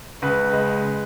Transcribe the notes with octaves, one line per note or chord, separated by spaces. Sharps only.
C#2 B4
G#3